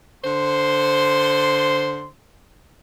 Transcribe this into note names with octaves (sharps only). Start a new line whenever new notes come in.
D3 C5 C6